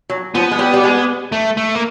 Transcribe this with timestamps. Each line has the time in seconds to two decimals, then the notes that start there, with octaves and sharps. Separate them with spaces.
0.10 F#3
0.35 F3 B3
0.51 G#3
0.59 G3
0.74 G3
0.83 G#3
1.32 A3
1.57 A3
1.75 A#3